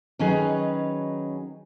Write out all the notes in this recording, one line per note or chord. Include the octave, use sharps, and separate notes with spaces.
D#3 F#3 C#4 D#4 G#4 B4